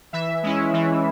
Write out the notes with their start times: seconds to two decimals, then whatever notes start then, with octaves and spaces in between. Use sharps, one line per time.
0.13 E3 E5
0.43 G#3 C#4 E4
0.73 E3